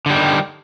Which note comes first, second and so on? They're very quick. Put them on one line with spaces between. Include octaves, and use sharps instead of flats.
D3 G3 D#3